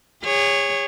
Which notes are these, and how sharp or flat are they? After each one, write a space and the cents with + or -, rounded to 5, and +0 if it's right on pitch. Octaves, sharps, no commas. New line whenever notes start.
G#4 -35 C#5 +0